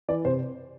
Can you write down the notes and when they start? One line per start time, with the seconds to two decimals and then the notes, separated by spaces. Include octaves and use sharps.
0.08 E3 D5
0.25 C3 C5